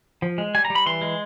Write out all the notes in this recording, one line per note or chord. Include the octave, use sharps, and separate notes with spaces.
F3
G#3
G3 G#5
A#5
G3
B5
E3 C6
G#3